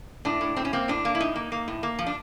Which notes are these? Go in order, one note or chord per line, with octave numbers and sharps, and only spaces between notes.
A2 D4
A2
A2 C4
C#4
A#3 C4
A2 D4
A#3
E4
A2 D#4
A#3
A#3
A2
A#3
F3
D4